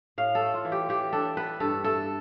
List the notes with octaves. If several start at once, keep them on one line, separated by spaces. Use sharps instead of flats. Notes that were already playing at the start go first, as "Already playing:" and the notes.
A2 F5
A4
A3
F4
E3
G4
E3 G4
D4 A4
B3 B4
G2 A4
A3 A4